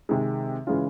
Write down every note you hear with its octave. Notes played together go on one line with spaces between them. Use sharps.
C3 D#3 G#3
C#3 E3 G#3 C#4 F4